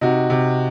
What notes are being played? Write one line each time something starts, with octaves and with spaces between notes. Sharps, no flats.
C3 D#4 F#4
C3